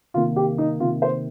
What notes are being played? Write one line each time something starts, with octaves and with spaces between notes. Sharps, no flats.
C3 D#3 A#3 F4
G4
D#4
C3 D#3 A#3 F4
C5